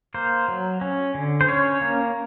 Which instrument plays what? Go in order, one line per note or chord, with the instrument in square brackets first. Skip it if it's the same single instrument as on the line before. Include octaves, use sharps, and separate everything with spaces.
[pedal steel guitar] A#3 C5
F#3
C#4
D3
C5
C#4 C#5
A#3